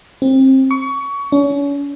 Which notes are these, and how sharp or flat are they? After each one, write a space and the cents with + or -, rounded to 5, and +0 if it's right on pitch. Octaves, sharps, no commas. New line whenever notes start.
C4 +25
C#6 +25
C#4 +40